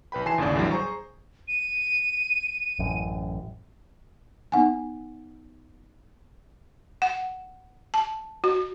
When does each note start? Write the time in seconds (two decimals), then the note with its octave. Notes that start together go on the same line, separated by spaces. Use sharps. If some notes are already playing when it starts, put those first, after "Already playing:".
0.12 B1 B4 G5 B5
0.26 E3 G#5 A5 C6 C7 E7
0.38 G1 D#2 A2 C#3 D5
0.55 A1 E2 D3 E3 F#3 G3
0.71 G#4 C5 A#5 C#6
1.48 D#7
2.79 A1 F#2
4.52 B3 D#4 F#5 G#5
7.02 F#5
7.94 A5
8.44 F#4